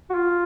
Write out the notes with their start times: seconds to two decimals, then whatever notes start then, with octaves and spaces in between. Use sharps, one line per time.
0.10 F#4
0.15 F4